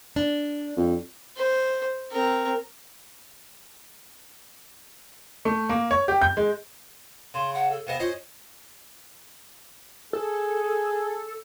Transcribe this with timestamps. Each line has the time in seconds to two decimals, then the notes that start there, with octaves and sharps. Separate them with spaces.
0.16 D4
0.77 F2
1.37 C5
2.12 C4 A#4
5.45 A3
5.69 A#3
5.91 C#5
6.08 G4
6.22 G6
6.37 G#3
7.34 C#3 C6
7.54 F#5
7.71 A4
7.87 C3 B3 D#5 F5
8.00 C#4 F4 C5 D#5
10.13 G#4 A4